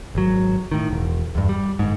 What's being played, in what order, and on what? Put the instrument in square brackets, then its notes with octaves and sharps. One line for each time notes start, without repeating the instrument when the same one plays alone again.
[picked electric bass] G#1 F#3
A2 D#3
E1
E2 G2
G3
G1 G#2